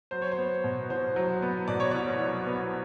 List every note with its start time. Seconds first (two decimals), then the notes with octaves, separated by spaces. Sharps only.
0.11 F#3 C5
0.22 C#5
0.32 C5
0.38 B3
0.64 B2
0.90 C2 C5
1.16 F#3
1.42 B3
1.68 B2 D5
1.80 C#5
1.91 C2 D5
2.20 F#3
2.47 B3